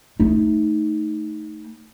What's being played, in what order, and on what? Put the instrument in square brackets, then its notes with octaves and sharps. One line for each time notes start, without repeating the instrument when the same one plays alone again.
[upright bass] A3 D#4